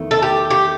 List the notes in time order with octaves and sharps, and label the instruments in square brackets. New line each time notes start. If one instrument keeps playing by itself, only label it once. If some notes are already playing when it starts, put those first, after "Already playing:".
Already playing: [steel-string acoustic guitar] E2 D#3 A3
[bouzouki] A4
G4
G4